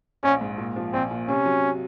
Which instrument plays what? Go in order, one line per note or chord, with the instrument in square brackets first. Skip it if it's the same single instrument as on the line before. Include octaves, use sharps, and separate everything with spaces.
[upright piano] A#1 [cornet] C#4
[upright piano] G#2
A#2
F3
[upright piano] A#1 [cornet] C4
[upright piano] A#2
[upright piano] C3 [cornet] C#4
[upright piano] F#3